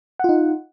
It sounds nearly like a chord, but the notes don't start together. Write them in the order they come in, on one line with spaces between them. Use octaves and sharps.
F#5 F4 D#4